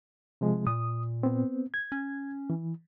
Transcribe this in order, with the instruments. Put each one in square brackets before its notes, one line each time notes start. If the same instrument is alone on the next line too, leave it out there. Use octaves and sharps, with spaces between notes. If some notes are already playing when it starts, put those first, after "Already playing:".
[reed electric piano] C3 F3 G#3
[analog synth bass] A#2 [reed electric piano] D#6
[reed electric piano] B3 C4
G#6
[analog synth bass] C#4
[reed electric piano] E3